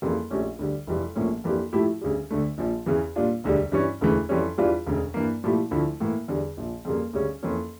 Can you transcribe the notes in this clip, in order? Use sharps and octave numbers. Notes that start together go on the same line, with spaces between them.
F2 C#3 E3 G3 A#3
A#1 A#2 A3 C#4 G4
D2 D3 G3
F1 F2 E3 G3
A#1 A2 F3 A#3 C#4
F2 E3 A#3 D4 G4
A2 F3 A3 E4 G4
D2 C#3 G3
D2 D3 A3
A#1 A#2 F3
E2 C#3 E3
A#2 G3 D4 F4
E1 D2 D3 G3
G2 E3 G3 C#4
E1 D2 C#3 E3 A3
F2 E3 G3 C#4
E2 E3 G3 D4 F4
E1 D2 C#3
G2 E3 A#3
A#2 F3 A3 E4 G4
D2 D3 F3 A3 E4
A2 E3 A#3
E2 D3 G3
A#1 A#2 F3
F2 C#3 G3 A#3
D2 C#3 G3 C#4
F2 E3 A#3 C#4